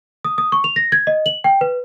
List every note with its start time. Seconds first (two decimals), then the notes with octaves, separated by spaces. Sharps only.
0.25 D#6
0.38 D#6
0.52 C#6
0.64 F7
0.76 A#6
0.92 G#6
1.07 D#5
1.26 F#7
1.44 G5
1.61 B4